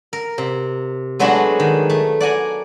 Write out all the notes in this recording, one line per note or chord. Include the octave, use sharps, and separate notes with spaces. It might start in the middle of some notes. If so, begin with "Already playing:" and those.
A#4
C3
F#3 G#3 A3 B3 D4 F#4
D#3
A3
D5 F#5 G#5 A#5